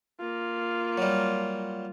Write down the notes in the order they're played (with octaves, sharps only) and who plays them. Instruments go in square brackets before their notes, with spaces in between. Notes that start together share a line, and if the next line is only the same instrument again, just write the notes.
[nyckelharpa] A#3 F4
[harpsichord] F#3 G3